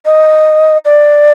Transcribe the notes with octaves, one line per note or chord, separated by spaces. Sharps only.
D#5
D5